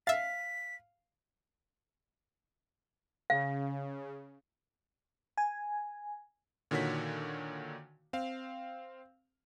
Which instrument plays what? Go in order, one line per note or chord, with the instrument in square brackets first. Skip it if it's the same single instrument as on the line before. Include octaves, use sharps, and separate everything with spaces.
[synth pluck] E5 A6 [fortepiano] F5 [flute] B6
[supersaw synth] C#3 [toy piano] F5
[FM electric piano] G#5
[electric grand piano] A#2 D3 D#3 F#4 C#5 B6
C4 F5